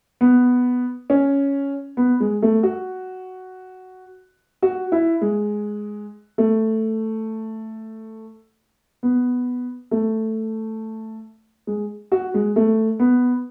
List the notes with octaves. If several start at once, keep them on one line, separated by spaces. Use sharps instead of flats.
B3
C#4
B3
G#3
A3
F#4
F#4
E4
G#3
A3
B3
A3
G#3
F#4
G#3
A3
B3